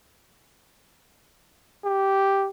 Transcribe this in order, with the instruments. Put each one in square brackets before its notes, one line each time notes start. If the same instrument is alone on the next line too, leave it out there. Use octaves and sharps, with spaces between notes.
[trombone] G4